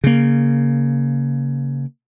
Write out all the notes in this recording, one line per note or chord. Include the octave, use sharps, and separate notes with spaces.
C#3 A#3